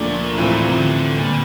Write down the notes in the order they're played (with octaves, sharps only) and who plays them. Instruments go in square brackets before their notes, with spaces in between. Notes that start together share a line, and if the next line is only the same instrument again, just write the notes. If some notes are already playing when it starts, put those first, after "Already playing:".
Already playing: [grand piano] D2 D3 F3 A3 D4 [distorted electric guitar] A#2
[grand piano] A2 E3 A3 C4 F4 [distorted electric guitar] C3
[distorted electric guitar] A#2
C3
D3
[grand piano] A#2 G3